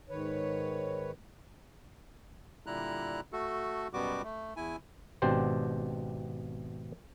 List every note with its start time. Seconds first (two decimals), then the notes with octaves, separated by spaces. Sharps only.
0.09 G#2 D#3 B4 C#5
2.66 A#2 D3 G3 E4 A#5 F#6
3.33 A3 F#4 A4
3.93 F#2 B2 G3 B3 F#4 D6
4.24 A3
4.56 E2 E4 G#5
5.22 G#1 B2 C4 D4 G4 C5